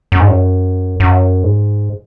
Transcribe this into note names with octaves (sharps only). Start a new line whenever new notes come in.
F#2
G#2
F#2
F#2
G#2